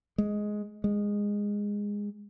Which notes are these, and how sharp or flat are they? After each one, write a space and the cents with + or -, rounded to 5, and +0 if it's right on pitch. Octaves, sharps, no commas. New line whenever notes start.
G#3 +5
G#3 -15